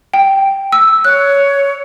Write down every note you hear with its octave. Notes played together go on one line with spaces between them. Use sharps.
G5
E6
C#5 F#6